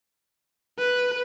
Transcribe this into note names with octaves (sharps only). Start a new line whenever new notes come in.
B4